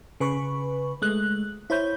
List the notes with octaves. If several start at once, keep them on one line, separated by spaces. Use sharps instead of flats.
C#3 B4 B5 C#6
G#3 A3 F#6
E4 C5 C#5 B5 G6